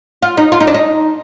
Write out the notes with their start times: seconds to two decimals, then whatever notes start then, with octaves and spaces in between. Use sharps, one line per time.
0.23 F4
0.37 D#4
0.52 F4
0.60 D#4
0.67 D4
0.74 D#4